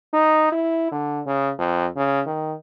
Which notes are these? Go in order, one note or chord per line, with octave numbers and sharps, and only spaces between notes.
D#4
E4
D3
C#3
F2
C#3
D#3